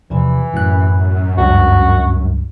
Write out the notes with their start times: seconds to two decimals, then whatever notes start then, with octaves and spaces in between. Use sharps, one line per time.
0.10 E2 C3 E3 F3
0.54 F#2 A2 F#6
1.37 C#2 G2 F#3 F#4